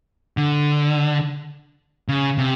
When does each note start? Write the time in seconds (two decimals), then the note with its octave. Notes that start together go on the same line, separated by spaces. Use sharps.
0.37 D3
2.08 C#3
2.38 C3